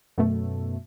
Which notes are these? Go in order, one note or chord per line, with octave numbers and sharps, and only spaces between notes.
F#2 B2 A3